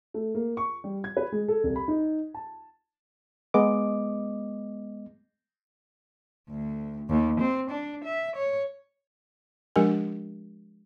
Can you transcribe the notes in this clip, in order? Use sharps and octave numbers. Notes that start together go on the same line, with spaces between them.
A3
A#3
C#6
G3
G#6
B4
G#3
A4
C2
B5
D#4
A5
G#3 B3 D#5 D6
D2
D#2
C4
D4
E5
C#5
F3 G#3 D4 G4 A#4 G#5